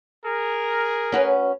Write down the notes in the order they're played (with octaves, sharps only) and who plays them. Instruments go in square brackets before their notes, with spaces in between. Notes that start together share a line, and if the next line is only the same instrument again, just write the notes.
[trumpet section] G#4 A#4
[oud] C#4 F#4 B4